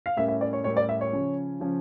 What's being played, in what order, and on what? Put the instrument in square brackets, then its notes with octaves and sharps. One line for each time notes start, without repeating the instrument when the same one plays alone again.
[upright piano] F5
[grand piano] A2 G3 C#4 G4 A#4 [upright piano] E5
[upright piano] E5
D5
C#5
[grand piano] A2 G3 C#4 G4 A#4 [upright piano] C#5
[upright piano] D5
E5
C#5
[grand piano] C#3 F3 C#4
C#3 F3 C#4